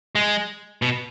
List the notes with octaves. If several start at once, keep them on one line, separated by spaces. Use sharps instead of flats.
G#3
B2